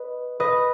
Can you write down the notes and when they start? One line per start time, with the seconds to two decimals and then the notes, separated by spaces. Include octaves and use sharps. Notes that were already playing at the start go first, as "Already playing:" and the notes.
Already playing: B4 D#5
0.40 B4 D#5